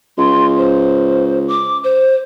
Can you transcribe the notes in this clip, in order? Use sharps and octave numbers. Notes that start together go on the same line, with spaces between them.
C#2 C6
C5
D6
C5